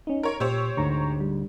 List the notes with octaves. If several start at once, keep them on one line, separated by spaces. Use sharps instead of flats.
C#4 D#4
A#4 C#5
A#2 G4 C5 C#5 E6
D2 G#2 A#5 C#6
G3